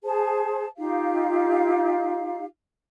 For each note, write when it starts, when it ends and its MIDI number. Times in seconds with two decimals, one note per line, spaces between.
0.04 0.67 68
0.04 0.67 72
0.04 0.67 81
0.78 2.44 63
0.78 2.44 65
0.78 2.44 67
0.78 2.44 77